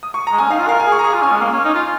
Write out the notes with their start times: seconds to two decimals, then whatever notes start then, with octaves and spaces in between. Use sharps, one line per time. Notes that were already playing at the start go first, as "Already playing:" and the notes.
0.03 D#6
0.14 C#6
0.27 G#3 A#5
0.38 C#4 G#5
0.50 D#4 F5
0.59 F4
0.68 A#4 F5
0.80 G#5
0.86 G#4
0.92 C#6
0.99 A#5
1.04 G#4 C#6
1.14 F4
1.22 C#4 G#5
1.31 G#3
1.41 A#3 F5
1.52 C#4
1.65 D#4
1.75 F4